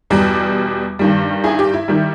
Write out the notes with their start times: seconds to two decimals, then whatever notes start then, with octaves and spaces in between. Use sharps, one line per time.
0.10 E2 B2 G3
0.99 G2 D#3 G3
1.44 E4 G#4
1.59 G4
1.74 E4
1.88 D#3 G3